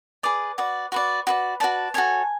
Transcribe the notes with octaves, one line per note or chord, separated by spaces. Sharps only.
G#4 B4 D5 D6
F#4 B4 D5
F#4 B4 D5 C#6
F#4 B4 D5
F#4 B4 D5 A5
F#4 A4 C#5 G#5